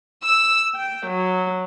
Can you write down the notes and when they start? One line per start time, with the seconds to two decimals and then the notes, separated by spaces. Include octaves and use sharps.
0.24 E6
0.76 G5
1.11 F#3